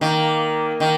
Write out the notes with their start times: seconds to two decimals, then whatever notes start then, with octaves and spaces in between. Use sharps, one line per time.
0.01 D#3 A#3
0.80 D#3